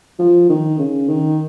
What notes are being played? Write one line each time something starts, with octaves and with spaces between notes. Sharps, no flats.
F3
D#3
C#3
D#3